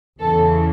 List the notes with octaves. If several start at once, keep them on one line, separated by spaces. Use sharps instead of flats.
E2 C#3 E3 A4